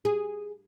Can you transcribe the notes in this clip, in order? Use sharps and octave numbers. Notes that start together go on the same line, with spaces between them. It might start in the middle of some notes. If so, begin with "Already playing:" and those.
G#4